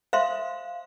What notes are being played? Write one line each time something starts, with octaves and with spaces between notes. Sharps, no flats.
C5 E5 F5 C6